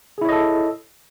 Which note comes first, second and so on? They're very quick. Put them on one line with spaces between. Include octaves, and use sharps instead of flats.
G#4 E4 C#5 D#5 A4